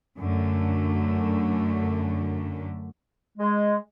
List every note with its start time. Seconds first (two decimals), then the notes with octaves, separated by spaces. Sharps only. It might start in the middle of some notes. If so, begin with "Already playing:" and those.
0.18 F#2 D3 A3
3.38 G#3